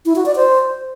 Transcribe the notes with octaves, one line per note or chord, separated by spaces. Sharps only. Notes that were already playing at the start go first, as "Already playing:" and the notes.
E4
F#4
D5
C5